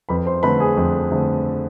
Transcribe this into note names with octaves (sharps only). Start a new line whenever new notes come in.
F2 B4 B5
C5 C6
D3 A3 C4 B4 B5
G#4 G#5
F2
D3 A3 C4